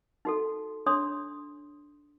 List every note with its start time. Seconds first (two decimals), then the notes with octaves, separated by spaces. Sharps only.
0.25 D#4 F#4 A4
0.86 D4 C#5 C6 D#6